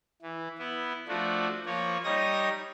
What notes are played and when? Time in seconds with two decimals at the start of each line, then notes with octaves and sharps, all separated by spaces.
0.22 E3
0.59 B3 E4
1.08 F3 A3 D4 F#4
1.66 F3 A#3 C#5
2.04 G3 D#4 C#5 D#6 A#6